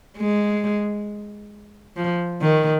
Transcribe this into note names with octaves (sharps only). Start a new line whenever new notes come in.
G#3
F3
D#3